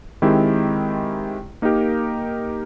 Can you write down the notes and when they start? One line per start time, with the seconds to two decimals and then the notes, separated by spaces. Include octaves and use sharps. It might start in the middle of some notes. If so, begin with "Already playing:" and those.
0.22 D#3 G#3 C4 E4 G4
1.62 A#3 D#4 G4 A#4